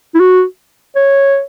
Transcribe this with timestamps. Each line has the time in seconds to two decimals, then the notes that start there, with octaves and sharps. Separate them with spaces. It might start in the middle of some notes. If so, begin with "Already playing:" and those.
0.14 E4
0.20 F#4
0.95 C#5